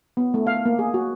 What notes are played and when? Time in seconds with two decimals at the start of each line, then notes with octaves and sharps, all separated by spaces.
0.17 B3
0.34 A3
0.47 F5
0.66 A#3
0.79 G#4
0.94 F#4